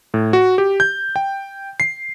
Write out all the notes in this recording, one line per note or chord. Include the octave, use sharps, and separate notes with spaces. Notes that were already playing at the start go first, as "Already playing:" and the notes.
A2
F#4
G4
G6
G5
C7